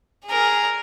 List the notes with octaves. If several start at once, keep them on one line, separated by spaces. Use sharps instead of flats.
G#4 A#4